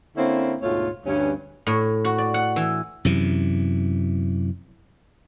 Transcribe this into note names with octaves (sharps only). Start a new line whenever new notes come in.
D3 A#3 C4 C#4 E4
D2 G#2 B2 A3 F4 C#5
D2 G2 C#4
A2
F#4
D5
F#5
E3
F#2 C3 E3